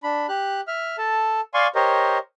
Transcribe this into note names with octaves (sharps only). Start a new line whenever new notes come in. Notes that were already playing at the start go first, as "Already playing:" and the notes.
D4 B5
G4 F#6
E5 F6
A4 A5
D5 F5 G#5 C6 C#6
G4 A#4 C5 C#5 D#5